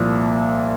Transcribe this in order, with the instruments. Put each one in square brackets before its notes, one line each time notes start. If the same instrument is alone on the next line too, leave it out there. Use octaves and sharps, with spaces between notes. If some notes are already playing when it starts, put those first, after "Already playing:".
Already playing: [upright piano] C2 A#2 F3